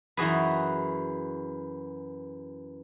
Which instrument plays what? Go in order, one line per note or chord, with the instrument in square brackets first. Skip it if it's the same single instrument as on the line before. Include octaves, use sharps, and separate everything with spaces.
[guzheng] F#2 E3 F#4 G#4 B4